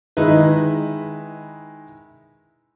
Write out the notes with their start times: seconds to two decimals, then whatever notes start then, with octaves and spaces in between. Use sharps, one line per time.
0.17 D#3 G#3 D#4 E4 B4